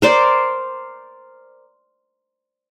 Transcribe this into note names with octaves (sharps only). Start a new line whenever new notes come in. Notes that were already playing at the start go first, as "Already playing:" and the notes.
A#4 C5 D5